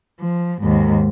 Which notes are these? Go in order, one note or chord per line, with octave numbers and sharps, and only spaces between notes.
F3
D#2 G#2